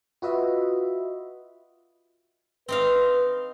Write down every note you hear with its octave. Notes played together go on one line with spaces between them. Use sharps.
F4 F#4 B4 D#5 E5
C4 D#4 B4 F5